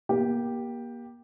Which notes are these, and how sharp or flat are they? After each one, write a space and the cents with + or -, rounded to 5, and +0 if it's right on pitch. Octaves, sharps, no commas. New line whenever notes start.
A#3 +30 G4 +0